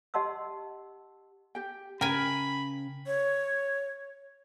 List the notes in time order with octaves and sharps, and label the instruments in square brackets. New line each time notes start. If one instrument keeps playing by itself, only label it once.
[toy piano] G4 D#5 F#5 A5 C6 E6
[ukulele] G4 G5
[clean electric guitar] C#3 [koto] A#4 G#5 [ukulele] G5 [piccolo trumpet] B5
[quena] C#5